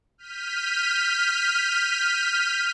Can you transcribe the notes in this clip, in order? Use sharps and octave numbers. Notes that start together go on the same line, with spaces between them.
F6 G6 B6 D#7